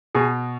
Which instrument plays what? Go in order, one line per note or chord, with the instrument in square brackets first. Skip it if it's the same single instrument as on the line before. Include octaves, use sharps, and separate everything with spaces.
[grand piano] B2 G#4